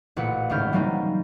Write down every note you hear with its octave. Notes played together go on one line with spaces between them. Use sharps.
A1 A#2 B4 F#5 C#7
G#1 C#2 A3 E4 F6 G6
E3 F#3 G3 A#3 C4 D#4